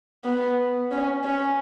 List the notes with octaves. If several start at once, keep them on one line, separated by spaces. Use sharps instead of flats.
B3
C#4
C#4